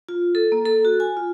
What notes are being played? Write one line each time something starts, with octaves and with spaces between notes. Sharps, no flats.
F4
A4
A#3
A4
F#4
G#5
F4